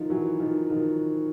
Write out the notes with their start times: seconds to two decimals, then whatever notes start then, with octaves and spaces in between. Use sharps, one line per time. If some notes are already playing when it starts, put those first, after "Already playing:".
Already playing: D#3 F3
0.10 E3 F#3
0.40 D#3 F3
0.70 D#3 F3